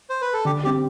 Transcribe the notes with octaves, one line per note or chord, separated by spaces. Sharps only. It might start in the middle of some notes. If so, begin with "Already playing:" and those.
C5
B4
A4
D3 G4
G3 C4 G4